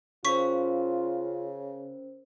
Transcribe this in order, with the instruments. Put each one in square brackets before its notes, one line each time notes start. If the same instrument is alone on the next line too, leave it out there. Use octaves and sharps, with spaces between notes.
[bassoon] C#3 [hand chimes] C#4 A#4 C5 [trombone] F4 [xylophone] C#6 B6